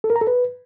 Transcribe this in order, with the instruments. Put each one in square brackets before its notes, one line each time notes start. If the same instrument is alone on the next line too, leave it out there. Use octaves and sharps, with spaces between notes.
[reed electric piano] A4
A#4
A#5
A4
B4